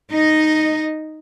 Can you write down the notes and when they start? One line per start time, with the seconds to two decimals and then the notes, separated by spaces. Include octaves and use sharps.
0.11 D#4 D#5